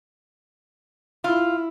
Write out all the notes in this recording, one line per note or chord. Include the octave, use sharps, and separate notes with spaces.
E4 F4